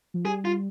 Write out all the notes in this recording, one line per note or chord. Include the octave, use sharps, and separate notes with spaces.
F3
G3 G#4
F4